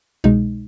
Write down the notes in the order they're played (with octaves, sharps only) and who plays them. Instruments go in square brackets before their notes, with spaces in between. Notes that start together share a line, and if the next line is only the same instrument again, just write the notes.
[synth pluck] C2 B2 G#3 D#4